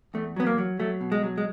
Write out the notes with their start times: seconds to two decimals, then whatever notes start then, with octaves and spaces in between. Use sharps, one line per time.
0.14 E2 A3
0.36 F#3 B3
0.46 A#3
0.58 F#3
0.80 F#3 A3
1.01 B2
1.12 G#3
1.23 F#3
1.38 G#3